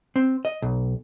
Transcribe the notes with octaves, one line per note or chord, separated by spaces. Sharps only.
C4
D#5
B1